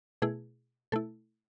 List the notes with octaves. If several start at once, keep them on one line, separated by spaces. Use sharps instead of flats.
B2 A3 E4 G#4
B2 A3 E4 A4